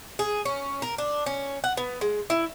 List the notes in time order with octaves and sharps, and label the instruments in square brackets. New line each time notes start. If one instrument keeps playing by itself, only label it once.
[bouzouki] G#4
C#4
A#4
D4
C#4
F#5
B3
G#3
E4